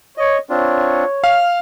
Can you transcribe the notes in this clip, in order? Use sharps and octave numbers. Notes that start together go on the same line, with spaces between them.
C#5 D#5
C4 D4 F4 C#5
F5 F6